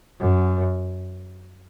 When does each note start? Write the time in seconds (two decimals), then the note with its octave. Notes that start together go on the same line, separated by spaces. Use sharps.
0.20 F#2